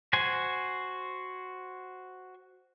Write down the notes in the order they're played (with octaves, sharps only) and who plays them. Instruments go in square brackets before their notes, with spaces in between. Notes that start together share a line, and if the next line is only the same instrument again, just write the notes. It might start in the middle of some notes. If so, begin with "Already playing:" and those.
[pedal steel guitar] F#4 C5 G#5